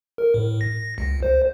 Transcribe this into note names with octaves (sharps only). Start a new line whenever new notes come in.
A#4
A2
A#6
C#2
C5